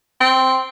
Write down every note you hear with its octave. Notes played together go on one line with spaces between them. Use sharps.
C4